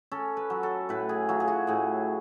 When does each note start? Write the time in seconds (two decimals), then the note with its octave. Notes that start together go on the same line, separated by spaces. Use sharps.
0.12 C#4 A4
0.37 B4
0.50 F#3
0.63 A4
0.89 A2 B4
1.09 G#4
1.29 F#3 F4
1.40 G#4
1.48 F#4
1.67 A2 G#4